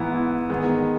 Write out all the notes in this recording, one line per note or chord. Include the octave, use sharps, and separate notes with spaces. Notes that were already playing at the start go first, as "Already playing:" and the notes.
Already playing: G#2 E3 B3 E4
D#3 G#3 B3